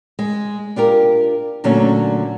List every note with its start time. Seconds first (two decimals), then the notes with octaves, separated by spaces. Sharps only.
0.19 G#3
0.76 D4 F4 G4 A#4
1.64 A#2 D3 F#3 A3 C#4